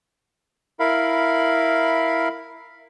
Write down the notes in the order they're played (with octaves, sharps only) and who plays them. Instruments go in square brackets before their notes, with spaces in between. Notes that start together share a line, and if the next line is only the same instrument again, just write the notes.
[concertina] E4 A#4 F5 B5